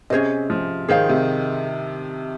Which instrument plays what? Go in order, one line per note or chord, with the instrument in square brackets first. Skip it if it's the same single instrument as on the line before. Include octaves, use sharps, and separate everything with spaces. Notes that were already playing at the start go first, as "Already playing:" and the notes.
[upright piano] C3 [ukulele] C#4 G#4 C5 D#5
[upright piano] F3
[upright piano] D#3 [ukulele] G#4 C5 F5
[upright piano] C3